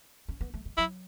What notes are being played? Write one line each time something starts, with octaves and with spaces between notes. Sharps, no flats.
C#4
B3
A3
G#3
F#3 E4